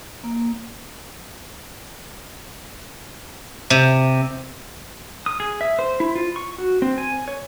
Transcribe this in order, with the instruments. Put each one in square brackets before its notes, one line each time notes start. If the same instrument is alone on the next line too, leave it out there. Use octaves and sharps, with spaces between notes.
[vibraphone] A#3
[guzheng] C3
[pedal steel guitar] D#6
G#4
E5
C5
E4
F4
C#6
F#4
C4
G#5
C#5